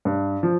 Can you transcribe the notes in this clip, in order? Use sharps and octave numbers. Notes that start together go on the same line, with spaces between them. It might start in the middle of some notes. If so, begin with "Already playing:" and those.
G2
F3